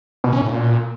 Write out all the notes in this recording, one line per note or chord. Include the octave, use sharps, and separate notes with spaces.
B2
C#4
A2
A#2